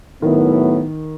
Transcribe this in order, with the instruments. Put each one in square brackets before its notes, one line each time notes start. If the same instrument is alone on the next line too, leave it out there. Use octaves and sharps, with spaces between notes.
[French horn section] A2 F#3 B3 E4 [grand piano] D#3